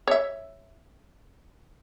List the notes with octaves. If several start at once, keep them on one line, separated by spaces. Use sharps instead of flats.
C#5 E5